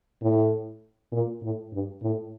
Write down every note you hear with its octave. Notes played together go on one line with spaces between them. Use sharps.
A2
A#2
A2
G2
A2